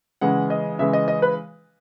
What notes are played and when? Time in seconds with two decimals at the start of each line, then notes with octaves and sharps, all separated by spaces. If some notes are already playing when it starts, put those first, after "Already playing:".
0.21 C#3 E3 G#3 F#5
0.50 D#5
0.79 C#3 E3 G#3 E5
0.93 D#5
1.08 D#5
1.22 B4